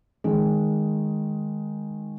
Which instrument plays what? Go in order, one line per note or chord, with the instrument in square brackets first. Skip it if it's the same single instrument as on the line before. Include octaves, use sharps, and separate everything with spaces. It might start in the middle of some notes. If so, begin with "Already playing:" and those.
[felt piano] D#3 G#3